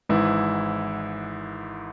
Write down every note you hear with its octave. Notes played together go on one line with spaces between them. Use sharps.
G#1 G#2 E3 E4